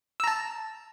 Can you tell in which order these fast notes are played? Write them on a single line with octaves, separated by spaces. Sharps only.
E6 A#5 A5